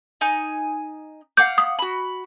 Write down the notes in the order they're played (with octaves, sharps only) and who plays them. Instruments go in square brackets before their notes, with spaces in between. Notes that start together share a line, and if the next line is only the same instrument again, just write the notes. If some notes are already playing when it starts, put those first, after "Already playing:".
[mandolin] D#4 G#5 G6
[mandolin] F5 F#5 D6 [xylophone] G6
[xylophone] D#6
[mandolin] F#4 B5